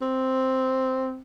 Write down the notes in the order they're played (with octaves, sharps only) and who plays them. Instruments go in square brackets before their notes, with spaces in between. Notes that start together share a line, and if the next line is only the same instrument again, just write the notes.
[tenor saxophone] C4